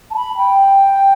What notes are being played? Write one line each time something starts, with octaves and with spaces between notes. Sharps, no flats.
A5
B5
G5